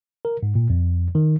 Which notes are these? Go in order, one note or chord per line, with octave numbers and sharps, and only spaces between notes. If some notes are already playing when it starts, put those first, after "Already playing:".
A#4
G#2
A#2
F2
D#3